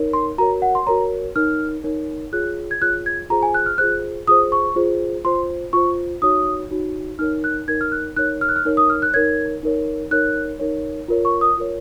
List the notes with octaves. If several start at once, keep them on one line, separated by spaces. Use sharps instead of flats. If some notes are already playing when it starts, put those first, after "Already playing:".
Already playing: D#4 A#4 C#5
C6
F#4 A#4 C#5 A#5
F#5
C6
F#4 A#4 C#5 A#5
D#4 A#4 C#5 F6
D#4 A#4 C#5
F4 G#4 C#5 F#6
G#6
F4 G#4 C#5 F#6
G#6
F4 G#4 C5 A#5
G#5
F#6
F6
F4 G#4 C5 F#6
F4 G#4 C5 D#6
C#6
F4 G#4 C5
F4 C5 C6
F4 C5 C#6
D#4 F#4 C#5 D#6
D#4 F#4 C#5
D#4 A#4 C#5 F6
F#6
D#4 A#4 C#5 G#6
F6
F#6
D#4 A#4 C#5 F#6
F6
F#6
F6
D#4 A#4 C#5
D#6
F6
F#6
D#4 A#4 C#5 G#6
D#4 A#4 C#5
D#4 A#4 C#5 F#6
D#4 A#4 C#5
F4 A#4 C#5
C#6
D#6
F4 A#4 C#5